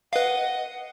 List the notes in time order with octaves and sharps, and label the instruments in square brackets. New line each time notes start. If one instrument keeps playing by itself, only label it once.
[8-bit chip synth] B4 F5 [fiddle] D#5 [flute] F#5